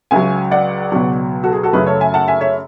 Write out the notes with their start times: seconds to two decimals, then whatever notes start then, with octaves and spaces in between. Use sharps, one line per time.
0.11 C#2 C#3 F#3 E5 G#5
0.51 D5 F#5
0.92 C#2 B2 F#3
1.43 F#4 A4
1.53 G#4
1.63 F#4 A4
1.73 F#2 C#3 F#3 A3 G#4 B4
1.87 A4 C#5
2.00 E5 G#5
2.14 F#5 A5
2.28 E5 G#5
2.41 C#5 E5